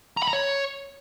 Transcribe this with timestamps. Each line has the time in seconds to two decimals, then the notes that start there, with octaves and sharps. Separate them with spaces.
0.17 A#5
0.23 B5
0.28 A#5
0.33 C#5